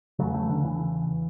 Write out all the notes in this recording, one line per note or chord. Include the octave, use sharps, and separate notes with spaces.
E2 C#3 F#3 A3
A3 C#4
D3
E3